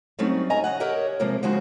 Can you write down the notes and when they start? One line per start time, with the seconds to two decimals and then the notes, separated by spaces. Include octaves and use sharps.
0.19 F#3 G3 A3 C4 C#4 D#4
0.50 D#5 G#5 A#5
0.64 C#3 D#5 F#5
0.80 G4 A#4 C#5 D#5 E5 F#5
1.19 C3 F3 G3 G#3 A#3 A#4
1.43 D#2 C#3 F3 G#3 F#4 C5